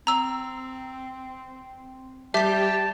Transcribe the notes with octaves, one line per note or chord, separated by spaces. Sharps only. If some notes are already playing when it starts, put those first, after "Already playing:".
C4 A#5 E6
G3 G4 E5 A5 B6